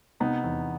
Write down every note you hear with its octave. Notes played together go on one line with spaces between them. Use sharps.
C3 B3 D#4
E2